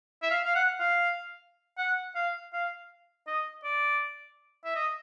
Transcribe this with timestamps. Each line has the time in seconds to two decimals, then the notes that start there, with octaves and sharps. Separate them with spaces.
0.23 E5
0.30 F5
0.45 F5
0.55 F#5
0.80 F5
1.78 F#5
2.15 F5
2.53 F5
3.27 D#5
3.64 D5
4.65 E5
4.76 D#5